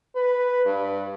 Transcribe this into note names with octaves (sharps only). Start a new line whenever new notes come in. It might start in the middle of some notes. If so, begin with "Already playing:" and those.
B4
G2